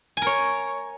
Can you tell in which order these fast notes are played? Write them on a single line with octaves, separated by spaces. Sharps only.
G#5 A#4 C#5